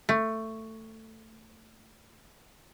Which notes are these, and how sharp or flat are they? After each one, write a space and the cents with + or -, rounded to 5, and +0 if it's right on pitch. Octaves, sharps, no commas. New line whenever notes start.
A3 +15